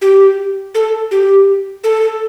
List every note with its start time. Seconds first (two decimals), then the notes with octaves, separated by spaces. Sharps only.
0.02 G4
0.75 A4
1.11 G4
1.84 A4